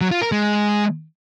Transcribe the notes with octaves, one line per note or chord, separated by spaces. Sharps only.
F#3
F4
A#4
G#3